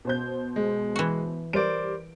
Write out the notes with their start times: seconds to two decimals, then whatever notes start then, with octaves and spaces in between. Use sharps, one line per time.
0.05 B2 C5 G6
0.56 G#3
0.96 E3 F#4
1.53 G3 A#4 C5 D5 D7